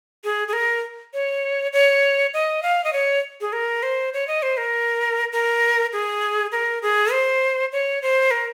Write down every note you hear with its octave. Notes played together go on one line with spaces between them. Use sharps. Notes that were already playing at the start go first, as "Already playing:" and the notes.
G#4
G#4
A#4
C#5
C#5
D#5
F5
D#5
C#5
G#4
A#4
C5
C#5
D#5
C5
A#4
A#4
G#4
A#4
G#4
C5
C#5
C5
A#4